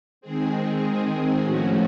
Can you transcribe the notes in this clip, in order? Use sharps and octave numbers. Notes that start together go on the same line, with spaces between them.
D#3 G#3 C4 G#4
A2 F3 A3 C#4 F#4